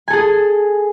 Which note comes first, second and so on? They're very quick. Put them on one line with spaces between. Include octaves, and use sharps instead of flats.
G#5 A4 G#4